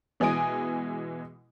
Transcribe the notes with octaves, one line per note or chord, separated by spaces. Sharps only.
B2 E3 G#3 G#5 D#6 D7